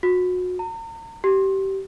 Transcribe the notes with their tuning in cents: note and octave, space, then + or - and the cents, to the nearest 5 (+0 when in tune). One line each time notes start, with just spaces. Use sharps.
F#4 -30
A#5 -40
G4 -25